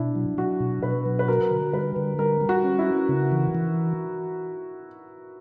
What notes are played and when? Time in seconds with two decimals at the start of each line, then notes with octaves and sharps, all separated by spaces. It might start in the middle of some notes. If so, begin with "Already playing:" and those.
Already playing: B2 D4 E4
0.16 F#3
0.38 F#3 F#4
0.60 B2
0.83 B2 B4
1.06 F#3
1.19 B4
1.28 F#4 A#4
1.50 D3
1.73 G3 B4
1.96 D3
2.18 G3 A#4
2.41 G3
2.49 F#4
2.64 C#4
2.79 E4
2.86 F#4
3.09 C#3
3.32 E3
3.55 E3